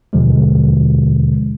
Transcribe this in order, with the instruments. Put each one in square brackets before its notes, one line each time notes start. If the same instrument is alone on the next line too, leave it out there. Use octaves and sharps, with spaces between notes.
[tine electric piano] D#2 B2 D3 F3 G#3